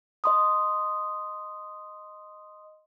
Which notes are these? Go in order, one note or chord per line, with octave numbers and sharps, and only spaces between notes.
D#5 C6 D#6